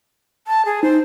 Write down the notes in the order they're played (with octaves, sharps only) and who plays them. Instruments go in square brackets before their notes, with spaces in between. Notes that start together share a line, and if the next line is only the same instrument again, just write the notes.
[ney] A5
G#4
[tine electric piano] D#4 [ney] C5